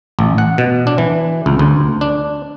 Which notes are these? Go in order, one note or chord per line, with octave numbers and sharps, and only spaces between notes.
A1
F#5
B2
D4
E3
C#2
D2
D4